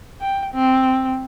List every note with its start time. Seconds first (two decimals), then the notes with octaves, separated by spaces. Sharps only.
0.21 G5
0.54 C4